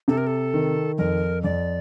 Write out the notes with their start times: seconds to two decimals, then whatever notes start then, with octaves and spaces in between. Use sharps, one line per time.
0.08 C3 A4
0.18 A#4
0.27 A4
0.54 D#3
0.98 F2 A#4
1.44 F2 D5